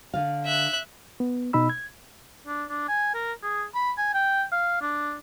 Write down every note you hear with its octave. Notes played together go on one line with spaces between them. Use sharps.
D3 F5
E5 F#6
B3
B2 D#4 B5 E6
G#6
D4
D4
G#5
A#4
G#4
B5
G#5
G5
F5
D4